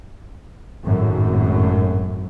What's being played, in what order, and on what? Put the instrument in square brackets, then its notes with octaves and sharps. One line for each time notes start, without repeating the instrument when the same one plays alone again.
[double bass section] G#1 F#2 A2